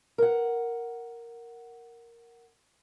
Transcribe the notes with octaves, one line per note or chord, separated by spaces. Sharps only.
A#4 F#5